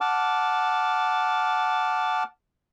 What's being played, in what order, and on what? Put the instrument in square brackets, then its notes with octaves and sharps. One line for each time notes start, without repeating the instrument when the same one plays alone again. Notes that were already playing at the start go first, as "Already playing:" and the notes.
[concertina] F#5 A5 D6 F6